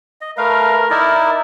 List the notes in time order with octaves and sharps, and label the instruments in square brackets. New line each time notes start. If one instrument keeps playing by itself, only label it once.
[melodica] D#5
[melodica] A3 B4 F5 [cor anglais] A#4
[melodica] D#4 A#4 D5 [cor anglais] E4